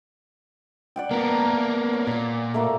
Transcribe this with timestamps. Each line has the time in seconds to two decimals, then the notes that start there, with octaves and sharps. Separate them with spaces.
0.96 D5 F#5 G5
1.11 A#3 B3 A#4 F#5 A5
1.93 C#5
2.07 A#2 D5 D6
2.54 A3 A#3 F#4